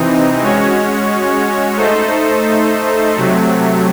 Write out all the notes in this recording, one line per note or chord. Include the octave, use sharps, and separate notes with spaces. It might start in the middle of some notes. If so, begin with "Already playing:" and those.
Already playing: C3 E3 C4 D#4
G#3 C#4 F#4 C#5
A3 D#4 A4 C5
C3 F#3 A3